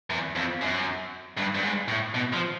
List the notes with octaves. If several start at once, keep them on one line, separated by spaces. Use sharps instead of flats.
E2
F2
F#2
G2
G2
G#2
A2
B2
F3